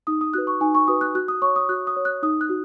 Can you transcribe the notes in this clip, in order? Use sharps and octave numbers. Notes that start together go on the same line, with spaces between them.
D#4 D#6
D#6
F#4 B4 F#6
C#6
D#4 G#5
C#6
F#4 B4 D#6
F#6
F#4 F#6
D#6
C#5 C#6
D#6
F#4 F#6
D#6
C#5
F#6
D#4 D#6
F#6
F#4